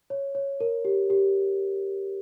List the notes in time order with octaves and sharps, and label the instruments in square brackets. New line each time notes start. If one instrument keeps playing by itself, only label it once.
[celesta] C#5
C#5
A#4
G4
G4